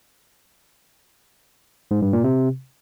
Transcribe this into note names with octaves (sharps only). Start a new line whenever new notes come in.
G#2
G2
A#2
C3